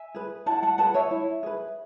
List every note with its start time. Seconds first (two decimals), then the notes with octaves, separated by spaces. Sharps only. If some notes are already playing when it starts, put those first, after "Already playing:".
Already playing: E5 G#5
0.15 G#4 B4
0.46 E4 F#5 A5
0.63 F#5 A5
0.78 G#4 B4 F#5 A5
0.94 C#5 E5
1.11 E4
1.43 G#4 B4